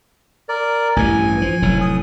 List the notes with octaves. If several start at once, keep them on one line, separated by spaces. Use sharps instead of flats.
A#4 D5
A1 G2 E3 G#5
F3
F1 A2 F#3
D#6